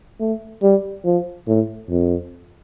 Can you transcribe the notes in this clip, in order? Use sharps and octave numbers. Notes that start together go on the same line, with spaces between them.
A3
G3
F3
A2
F2